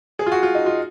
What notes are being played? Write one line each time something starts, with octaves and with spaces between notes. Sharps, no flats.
G#4
F4
F#4
F4
D#4
F4